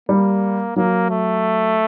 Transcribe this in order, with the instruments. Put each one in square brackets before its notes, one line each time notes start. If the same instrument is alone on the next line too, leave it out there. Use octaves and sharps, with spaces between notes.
[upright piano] G3 [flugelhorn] A#3
[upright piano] F#3 [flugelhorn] A#3
[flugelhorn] A3